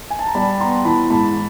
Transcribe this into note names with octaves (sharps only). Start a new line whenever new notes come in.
G#5
A5
A#5
G3 A5 B5
B3 A#5 C6
E3 A5 B5
G#2 A5 B5